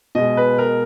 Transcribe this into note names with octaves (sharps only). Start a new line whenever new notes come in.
B2 G#3 D#5
B4
A#4